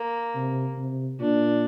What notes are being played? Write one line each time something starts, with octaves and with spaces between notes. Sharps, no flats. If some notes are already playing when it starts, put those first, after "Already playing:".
Already playing: A#3
C3
C3
A#2 D4